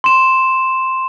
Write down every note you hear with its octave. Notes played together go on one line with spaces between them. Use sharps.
C6 E7